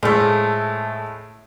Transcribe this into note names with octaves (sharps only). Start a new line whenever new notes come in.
A2 F3 G#3 A3